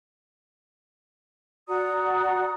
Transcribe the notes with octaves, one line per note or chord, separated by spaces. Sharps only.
F#4 D5 A#5 D#6